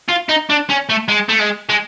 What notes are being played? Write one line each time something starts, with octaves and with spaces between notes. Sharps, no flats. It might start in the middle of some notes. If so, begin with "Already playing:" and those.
F4
D#4
D4
C#4
A3
G#3
A3
G#3
G#3